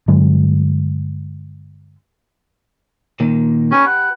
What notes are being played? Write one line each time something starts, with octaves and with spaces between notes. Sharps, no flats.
G2 D3 F#3 G#3
A#2 D#3 A#3
C#4 G4 B4
F#5